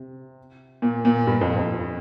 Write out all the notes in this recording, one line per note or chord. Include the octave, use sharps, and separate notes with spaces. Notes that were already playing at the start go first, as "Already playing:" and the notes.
Already playing: C3
A#2
A#2
G2
F2
F2